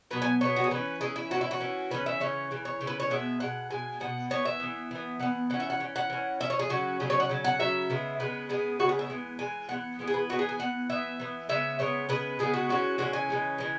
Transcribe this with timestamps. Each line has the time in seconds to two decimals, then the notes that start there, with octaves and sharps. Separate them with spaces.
0.11 B2 F#3 B3 B4
0.22 G#5
0.41 B2 F#3 B3 C#5
0.56 F#4
0.64 G#4
0.71 E3 C#4 B4
1.01 E3 C#4 G#4
1.16 E4
1.31 E3 C#4 F#4
1.41 E4
1.51 F#4
1.60 E3 C#4
1.91 C#3 E3 C#4 B4
2.06 E5
2.20 C#3 E3 C#4 C#5
2.51 C#3 E3
2.65 C#5
2.81 C#3 E3 C#4
2.87 B4
3.00 C#5
3.10 B2 G#3 B3 E5
3.40 B2 G#3 F#5
3.71 B2 G#3 G#5
4.00 B2 G#3 B3 F#5
4.30 E3 B3 C#5
4.45 E5
4.60 E3 B3
4.91 E3 B3
5.20 E3 B3 F#5
5.50 E3 C#4 F#5
5.60 E5
5.70 F#5
5.80 E3 C#4
5.96 F#5
6.10 E3 C#4
6.40 E3 C#4 E5
6.50 C#5
6.59 G#4
6.69 C#3 F#3 C#4 F#4
7.00 C#3 F#3 C#4 G#4
7.10 C#5
7.20 F#5
7.29 C#3 F#3 C#4
7.44 F#5
7.60 C#3 F#3 C#4 E5
7.90 C#3 G#3 B3
8.20 C#3 G#3 B3 B4
8.49 C#3 G#3 B3 G#4
8.79 C#3 G#3 B3 F#4
8.89 G#4
8.99 E5
9.10 E3 G#3 B3
9.39 E3 G#3 G#5
9.69 G#3 B3 F#5
9.73 E3
9.99 E3 G#3 B3
10.08 G#4
10.14 B4
10.29 E3 B3 F#4
10.39 G#4
10.49 G#5
10.59 E3 B3 F#5
10.90 E3 B3 E5
11.20 E3 B3
11.49 C#3 G#3 B3 E5
11.79 C#3 G#3 B3 C#5
12.09 C#3 G#3 B3 B4
12.39 C#3 G#3 B3 G#4
12.54 F#4
12.69 C#3 E3 G#3 C#4 F#4
12.98 C#3 E3 G#3 C#4 F#4
13.13 G#5
13.29 C#3 E3 G#3 C#4
13.58 C#3 E3 G#3 C#4